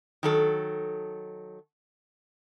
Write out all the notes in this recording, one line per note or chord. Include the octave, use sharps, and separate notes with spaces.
D#3 F#3 A4